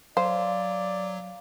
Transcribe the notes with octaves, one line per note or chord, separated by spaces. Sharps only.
F#3 C5 D5 F5